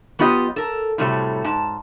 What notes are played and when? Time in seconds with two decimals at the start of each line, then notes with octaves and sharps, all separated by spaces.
0.19 F#3 B3 F4 G4 D#5
0.56 A4 A#4
0.98 A2 C3 F#3 G3 A3
1.44 G#2 A5